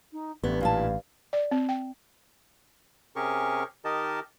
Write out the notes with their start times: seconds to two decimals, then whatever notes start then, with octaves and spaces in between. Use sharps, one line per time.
0.12 D#4
0.44 A1 G2 A3 B3
0.61 A#2 E4 F5 A5
1.33 D5
1.51 C4
1.69 G5
3.16 C3 C#4 G4 G#4 A#4 C#6
3.85 D#3 D#4 G4 A#4 D#5 A5